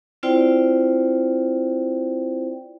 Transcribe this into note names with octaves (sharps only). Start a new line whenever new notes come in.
C4 E4 F4 C5 D5 G5